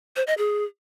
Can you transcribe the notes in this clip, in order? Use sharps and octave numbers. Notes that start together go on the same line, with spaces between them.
C5
D#5
G#4